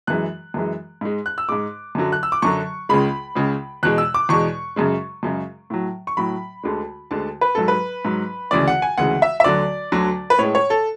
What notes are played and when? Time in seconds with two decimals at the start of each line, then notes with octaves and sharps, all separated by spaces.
0.07 F#2 E3 G#3 F#6
0.54 F#2 E3 G#3
1.01 G#2 G#3
1.26 F#6
1.38 E6
1.49 G#2 G#3 D6
1.95 F#2 D3 F#3
2.12 F#6
2.23 E6
2.32 D6
2.42 F#2 D3 F#3 C#6
2.89 C#2 C#3 G#3 B5
3.35 C#2 C#3 G#3
3.83 E2 B2 G#3 F#6
3.98 E6
4.14 D6
4.29 E2 B2 G#3 C#6
4.76 F#2 C#3 G#3
5.23 F#2 C#3 G#3
5.70 A2 F#3
6.07 C#6
6.17 A2 F#3 B5
6.63 D2 D3 G#3
7.11 D2 D3 G#3 A5
7.41 B4
7.55 G#2 F#3 A4
7.68 B4
8.05 G#2 F#3
8.51 D2 C#3 E3 G#3 D5
8.67 F#5
8.82 G#5
8.98 D2 C#3 E3 G#3 F#5
9.22 E5
9.40 E5
9.44 D2 D3 F#3 D5
9.92 D2 D3 F#3
10.30 B4
10.39 A2 G#3 C#5
10.55 C#5
10.70 A4